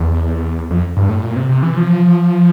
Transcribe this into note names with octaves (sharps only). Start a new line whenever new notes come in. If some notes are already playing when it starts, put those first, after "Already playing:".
Already playing: E2
F2
G2
A2
A#2
C3
C3
E3
F3